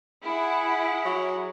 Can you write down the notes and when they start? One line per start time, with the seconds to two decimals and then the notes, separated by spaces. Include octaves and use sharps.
0.24 E4 G#4 F#5
1.05 F#3